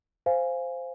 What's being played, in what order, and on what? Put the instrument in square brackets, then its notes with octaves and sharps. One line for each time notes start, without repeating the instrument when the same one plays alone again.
[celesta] C5 F5 G#5